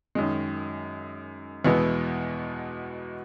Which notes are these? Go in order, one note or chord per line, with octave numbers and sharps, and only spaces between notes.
F#2 D#3 G#3
E2 B2 G#3 B3 E4